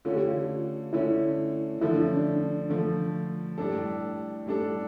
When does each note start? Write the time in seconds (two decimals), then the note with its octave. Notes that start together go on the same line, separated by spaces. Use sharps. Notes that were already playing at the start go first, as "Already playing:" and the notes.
0.05 D3 A3 C#4 F4
0.16 G4
0.28 F4
0.93 D3 A3 C#4 E4
1.81 D3 F3 A3 E4
1.93 D4
2.06 C#4
2.17 D4
2.69 D3 F3 A3
3.58 A2 G3 D4 A4
4.46 A2 G3 D4 A4